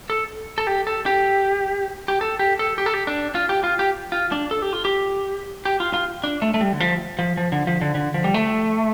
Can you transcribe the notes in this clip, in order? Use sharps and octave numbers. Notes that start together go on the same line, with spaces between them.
A4
A4
G4
A4
G4
G4
A4
G4
A4
G4
A4
G4
D4
F4
G4
F4
G4
F4
D4
A4
G4
F4
G4
G4
F4
F4
D4
A3
A3
G3
D3
F3
F3
F3
D3
F3
D3
D3
F3
G3
A3